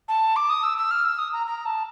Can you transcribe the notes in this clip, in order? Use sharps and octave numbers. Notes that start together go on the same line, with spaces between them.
A5
D6
D#6
E6
E6
F6
E6
D#6
A#5
A#5
A5